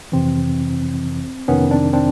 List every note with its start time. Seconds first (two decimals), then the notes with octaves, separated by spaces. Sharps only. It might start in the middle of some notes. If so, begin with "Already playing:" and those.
0.12 F2 C3 E3 C4
1.48 F2 C3 D#3 B3 C#4
1.71 C4 D4
1.93 C4 D4